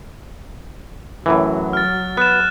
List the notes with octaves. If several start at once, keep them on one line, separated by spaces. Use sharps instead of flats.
F#2 A2 E3 F#3
F6 A6
B3 F#6 E7